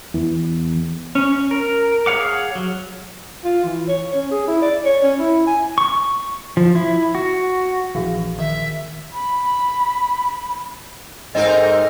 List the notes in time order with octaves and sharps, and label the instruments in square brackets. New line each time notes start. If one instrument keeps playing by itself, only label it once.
[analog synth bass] E2
[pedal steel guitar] C#4
A#4
G#4 C#5 F5 F#5 D6
F#3
[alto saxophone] F4
E3
C#5
C#4
G#4
E4
D5
C#5
C#4
E4
G#5
[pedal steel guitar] C#6
F3
E4
F#4
[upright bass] A#1 [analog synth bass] E3 [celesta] F#4 G#4 F5
[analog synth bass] D#3 [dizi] E5
[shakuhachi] B5
[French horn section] G#2 [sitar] C4 D#4 A#4 [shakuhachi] A4 [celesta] D#5